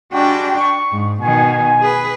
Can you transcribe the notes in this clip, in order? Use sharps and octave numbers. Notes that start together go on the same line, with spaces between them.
G3 G#3 D4 F#4 G5
C#6
G#2
B2 D#3 G#5
G#4 B4